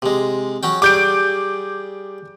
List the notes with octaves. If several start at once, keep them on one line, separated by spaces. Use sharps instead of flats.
C3 G#3
F#3 C#4 G5
G3 G#4 G#5 D6 G6 D7